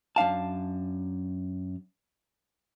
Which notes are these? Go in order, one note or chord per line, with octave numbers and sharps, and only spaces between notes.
F#2 D4 F5 A5